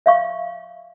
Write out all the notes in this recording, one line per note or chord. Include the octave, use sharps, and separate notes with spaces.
E5 F5 C#6